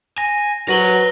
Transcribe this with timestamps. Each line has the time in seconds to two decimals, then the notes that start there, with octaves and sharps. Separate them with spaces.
0.18 G#5 A#6
0.68 F#3 A#4 B4 A#6 F#7 G7